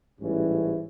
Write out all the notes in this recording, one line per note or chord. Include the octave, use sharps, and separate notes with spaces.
A1 G#2 E3 G3 C#4